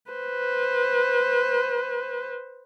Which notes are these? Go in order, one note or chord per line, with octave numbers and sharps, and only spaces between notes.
B4 C5